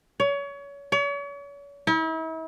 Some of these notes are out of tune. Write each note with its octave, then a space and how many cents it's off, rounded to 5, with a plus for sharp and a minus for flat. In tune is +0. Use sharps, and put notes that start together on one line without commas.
C#5 +30
C#5 +40
E4 -40